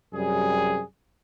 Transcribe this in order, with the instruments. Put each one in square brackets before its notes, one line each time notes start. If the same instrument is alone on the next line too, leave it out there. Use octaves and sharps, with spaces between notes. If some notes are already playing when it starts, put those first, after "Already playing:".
[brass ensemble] F#2 C3 G3 G#4